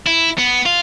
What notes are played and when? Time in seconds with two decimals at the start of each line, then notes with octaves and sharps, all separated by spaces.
0.07 E4
0.38 B3
0.66 F4